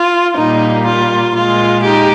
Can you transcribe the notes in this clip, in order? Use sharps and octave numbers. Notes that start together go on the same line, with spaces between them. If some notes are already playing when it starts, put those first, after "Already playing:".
Already playing: F4
A#2 G3 A#3 D#4
F4
A#2 G#3 F4
D#4 G4